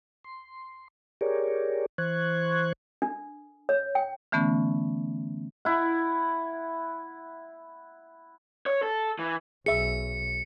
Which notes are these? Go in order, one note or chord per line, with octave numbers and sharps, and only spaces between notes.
C6
G4 G#4 A#4 C#5 D5
E3 C5 C#6 F#6 G#6
D4
C#5
G5
D3 E3 A3 B3 C#4
E4 F#5
C#5
A4
E3
B1 G#4 E5 C#7